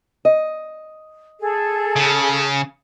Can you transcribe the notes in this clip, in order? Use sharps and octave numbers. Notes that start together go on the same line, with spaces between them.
D#5
G#4 A4
C#3